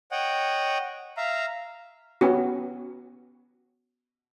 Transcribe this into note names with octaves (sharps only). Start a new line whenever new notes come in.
C#5 D#5 F#5 G5
E5 F5 A#5
B3 C#4 F#4